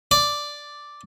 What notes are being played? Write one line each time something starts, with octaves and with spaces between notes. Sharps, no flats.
D5